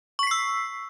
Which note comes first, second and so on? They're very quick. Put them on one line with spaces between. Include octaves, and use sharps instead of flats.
C#6 B6 C7 E6